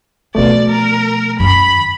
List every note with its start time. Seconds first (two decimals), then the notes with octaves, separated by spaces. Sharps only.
0.35 B2 F3 A3 D4 D5
0.69 A#4
1.40 F#2 D#3 B5